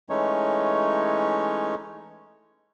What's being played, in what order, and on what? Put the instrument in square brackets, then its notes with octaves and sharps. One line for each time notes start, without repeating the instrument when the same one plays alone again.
[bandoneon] E3 G#3 A3 C#4 D#4 C#5